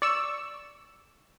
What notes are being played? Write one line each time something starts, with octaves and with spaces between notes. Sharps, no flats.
D5 C#6 E6